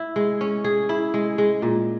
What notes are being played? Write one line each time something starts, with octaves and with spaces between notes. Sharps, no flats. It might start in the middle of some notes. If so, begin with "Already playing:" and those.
Already playing: E4
G#3
C#4
G#4
E4
G#3
G#3
A#2